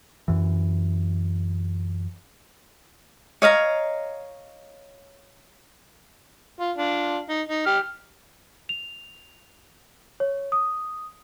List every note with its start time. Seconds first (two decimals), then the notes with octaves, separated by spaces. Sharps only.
0.28 F#2 E3
3.42 C#5 D#5 F5 A#5
6.60 F4
6.77 D4 F4
7.29 D#4
7.49 D#4
7.66 G4 F6
8.69 F7
10.20 C#5
10.52 D#6